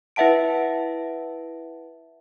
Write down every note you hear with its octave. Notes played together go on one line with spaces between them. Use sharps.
E4 B4 E5 F#5 A5 D7